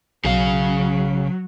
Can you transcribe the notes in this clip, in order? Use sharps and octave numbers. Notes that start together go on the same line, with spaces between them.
B1 C#3 F#3 F5